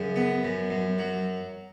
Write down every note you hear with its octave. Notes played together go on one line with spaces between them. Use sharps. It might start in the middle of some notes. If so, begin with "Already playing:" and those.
Already playing: F#2 C#3
B3
F#2
F#2
F#3